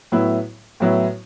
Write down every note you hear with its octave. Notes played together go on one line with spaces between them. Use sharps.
A2 F#3 B3 E4
A2 F#3 B3 E4